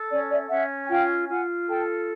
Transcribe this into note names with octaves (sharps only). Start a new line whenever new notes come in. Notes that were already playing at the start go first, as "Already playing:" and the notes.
Already playing: A4
C#4 D5
D5 E5
C#4 E5 F#5
G#5
F4 F5 G5
F4 F#5 G#5
A4 G5 A5